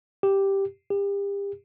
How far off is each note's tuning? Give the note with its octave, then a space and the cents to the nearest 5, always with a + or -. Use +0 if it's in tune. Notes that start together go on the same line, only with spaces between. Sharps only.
G4 +0
G4 +35